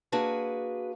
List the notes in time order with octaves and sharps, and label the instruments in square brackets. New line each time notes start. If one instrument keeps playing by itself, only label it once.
[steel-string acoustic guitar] A#3 D4 F#4 G#4 B4